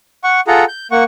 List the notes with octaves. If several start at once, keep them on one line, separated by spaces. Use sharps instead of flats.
F#5 C#6
F4 G#4 A4 F#5 A#5
G6
A#3 F#5 C#6